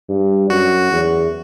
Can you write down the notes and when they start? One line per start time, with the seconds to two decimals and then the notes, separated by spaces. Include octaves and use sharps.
0.09 G2
0.50 F#2 F#4
0.91 E2